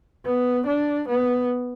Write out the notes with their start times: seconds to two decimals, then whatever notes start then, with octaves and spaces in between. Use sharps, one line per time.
0.26 B3
0.66 D4
1.08 B3